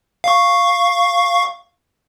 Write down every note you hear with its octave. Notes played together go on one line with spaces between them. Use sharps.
F5 C#6